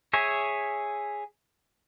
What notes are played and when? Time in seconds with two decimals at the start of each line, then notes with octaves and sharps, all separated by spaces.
0.13 G#4 C#5 E5 G#5